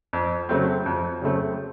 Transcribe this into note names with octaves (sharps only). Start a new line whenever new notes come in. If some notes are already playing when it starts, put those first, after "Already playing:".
F2
C#3 F#3 A3 C4
F2
C#3 F#3 A3 C4